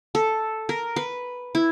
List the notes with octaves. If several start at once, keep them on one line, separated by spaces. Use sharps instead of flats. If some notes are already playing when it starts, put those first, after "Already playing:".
A4
A#4
B4
E4